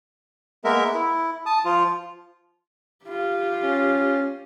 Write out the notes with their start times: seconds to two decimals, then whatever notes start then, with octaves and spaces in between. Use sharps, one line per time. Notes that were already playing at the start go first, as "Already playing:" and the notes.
0.64 G#3 A#3 B3 A#4 E5
0.94 E4
1.46 A5 D#6
1.65 F3 F4
3.05 F4 G4
3.62 C#4